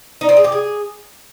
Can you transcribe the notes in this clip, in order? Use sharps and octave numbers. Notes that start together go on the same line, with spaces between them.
D#4
C4
G#4
G4
G#4